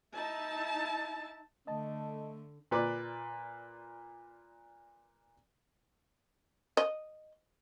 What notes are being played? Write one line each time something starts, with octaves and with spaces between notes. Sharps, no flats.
D#4 E4 A5
D3 A3 D#5 A5
A#2 B4 D5
D#5